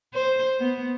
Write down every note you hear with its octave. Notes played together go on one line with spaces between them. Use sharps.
C5
B3